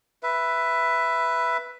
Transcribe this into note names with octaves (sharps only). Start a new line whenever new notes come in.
B4 E5